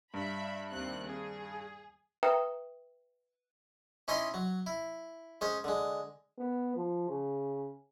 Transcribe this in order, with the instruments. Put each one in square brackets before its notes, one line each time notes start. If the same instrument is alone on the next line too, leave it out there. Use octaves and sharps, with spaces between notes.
[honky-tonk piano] G2 [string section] E5 B5
[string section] D#2 C3 F#6
G#4
[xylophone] B4 E5 G5 A#5 D#6
[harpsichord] C#4 D#4 E4 C#5 D#5 C6
F#3
E4
G#3 C#4 C5
D3 G#3
[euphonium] B3
F3
C#3